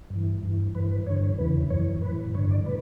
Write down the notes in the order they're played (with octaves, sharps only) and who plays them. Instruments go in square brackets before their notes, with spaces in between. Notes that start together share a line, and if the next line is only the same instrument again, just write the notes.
[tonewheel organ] G2
E3
G2 E3
G2 E3 B4
B4
G2 D3 C#5
E2 C#3 E3 B4
F#2 E3 C#5
A2 E3 B4
G2 D3 C#5
D5
A2 B4